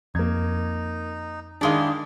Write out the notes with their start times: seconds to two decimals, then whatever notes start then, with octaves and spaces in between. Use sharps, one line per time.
0.15 F2 A#3 D#4 G#6
1.61 D#3 G#3 D4 E4 G4 G#4 F5